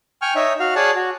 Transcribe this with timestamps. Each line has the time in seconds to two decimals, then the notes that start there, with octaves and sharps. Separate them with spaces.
0.22 G5 G#5 C#6 F6
0.35 D#4 C#5 E5
0.60 F#4 F5
0.76 G#4 C#5 D5 F#5 A5
0.95 F#4